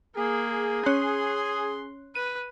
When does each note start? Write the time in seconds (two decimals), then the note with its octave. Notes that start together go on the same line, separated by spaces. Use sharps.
0.16 A#3 G#4
0.86 C#4 C#5 C6 F#6
2.15 B4 D#7